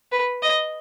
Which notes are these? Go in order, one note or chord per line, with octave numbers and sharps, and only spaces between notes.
B4
D#5